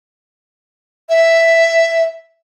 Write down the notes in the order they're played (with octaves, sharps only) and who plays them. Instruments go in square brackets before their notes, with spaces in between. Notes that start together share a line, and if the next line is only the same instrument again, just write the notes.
[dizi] E5